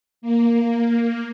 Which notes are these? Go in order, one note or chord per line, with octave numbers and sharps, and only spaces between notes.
A#3